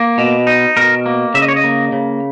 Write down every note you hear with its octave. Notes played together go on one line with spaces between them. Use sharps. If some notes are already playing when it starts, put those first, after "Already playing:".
Already playing: A#3
B2
D#4
B2 A#4
A#3
C#3 E5
D#5
C#5
D#5
A#3
C#3